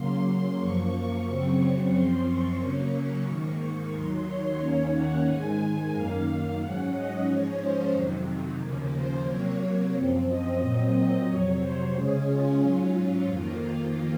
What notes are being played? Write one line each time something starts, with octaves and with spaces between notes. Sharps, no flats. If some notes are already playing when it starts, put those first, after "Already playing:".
Already playing: C#3 F#3 A#3 C6
F#2 F3 A#3 C#6
F#2 C#3 F#3 C4
F#2 F3 C4 C6
C#6
C#3 F#3 A#3 C#4 C#6
G#2 D#3 A#3
D#2 D#3 F#3 C6
C#5
D#2 D#3 A#3 C#4
F#5
G#2 D#3 G#3 G#5
F#2 D#3 A#3 F5
F5
G#2 F#3 C#4 F#5
D#5
G#2 F3 G#3 C#4 C#5
C5
F2 C3 D#3 F#3
D#2 C#3 F3 A#3
C5
C3 F#3 A#3 C#5
F#2 F3 C4
D#5
A#2 F#3 C4
D#5
F2 C3 F#3 C#5
C5
C#3 G#3 C#4 G#4
F4
G#2 F#3 C#4
F4
F2 D#3 A#3 F4